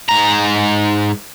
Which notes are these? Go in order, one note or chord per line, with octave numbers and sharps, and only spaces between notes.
G#2 A#5